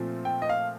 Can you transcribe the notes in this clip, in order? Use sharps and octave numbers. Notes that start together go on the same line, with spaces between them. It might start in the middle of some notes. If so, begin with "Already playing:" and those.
Already playing: A#2 F3 A3 C4
G5
D#5
F5